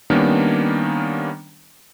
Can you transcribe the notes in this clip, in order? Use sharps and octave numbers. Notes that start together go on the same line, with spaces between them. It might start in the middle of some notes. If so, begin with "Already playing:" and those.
D#3 G3 A#3 B3 C#4 D4